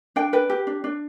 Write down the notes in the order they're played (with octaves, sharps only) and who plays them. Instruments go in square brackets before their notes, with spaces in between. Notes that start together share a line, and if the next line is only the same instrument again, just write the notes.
[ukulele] D4 G5
B4 G5
G4
D4
D4